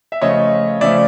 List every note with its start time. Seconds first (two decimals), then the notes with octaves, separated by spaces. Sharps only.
0.12 E5
0.21 C#3 F3 A3 C#5 D#5
0.81 C#3 F3 A3 D5 E5